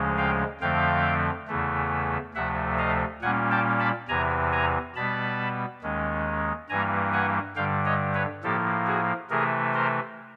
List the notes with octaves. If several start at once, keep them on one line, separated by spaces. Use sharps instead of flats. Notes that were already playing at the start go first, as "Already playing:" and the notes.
Already playing: D2 C#3 F3 G#3 C#4
F5 G5
F2 D3 F3 A3 C4 F5 G5
E2 C#3 E3 A3
D2 C3 F3 A3 E5 F#5
D#5 F5
A#2 G3 A#3 C#4 F#5 G#5
G5 A5
A5 B5
E2 C3 E3 G#5 A#5
G#5 A#5
B2 G3 B3 A5 B5
D#2 D#3 G#3 C#4
G2 E3 G3 A#3 G#5 A#5
F#5 G#5
G2 D3 G3 F5 G5
C#5 D#5
B4 C#5
A2 F3 A#3 G4 A4
F#4 G#4
C3 E3 A3 G#4 A#4
A#4 C5